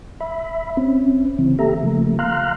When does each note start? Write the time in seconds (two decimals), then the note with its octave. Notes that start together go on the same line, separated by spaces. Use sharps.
0.20 E5 B5
0.77 C4 C#4
1.39 C#3 E3 C4
1.59 A#3 G4 A4 E5 A#5
1.83 C#3 F3 A3 A#3
2.19 F5 A#5 C6 F6 F#6